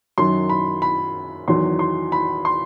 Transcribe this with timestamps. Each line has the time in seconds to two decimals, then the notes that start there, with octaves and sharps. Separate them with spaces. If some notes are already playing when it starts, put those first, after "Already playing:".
0.18 F#2 D#3 F#3 C6
0.50 B5
0.82 B5
1.48 E2 D#3 F#3 C6
1.79 C6
2.12 B5
2.45 C6